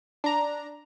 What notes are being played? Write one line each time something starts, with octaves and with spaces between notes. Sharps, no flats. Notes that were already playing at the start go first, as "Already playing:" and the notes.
D4 A#5